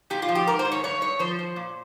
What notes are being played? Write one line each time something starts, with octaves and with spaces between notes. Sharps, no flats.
A#2 G4
F4
F3
G4
G#2 A#4
C5
G#2
C#5
G2 C#5
G2 C#5
F3 C5
F3
A#2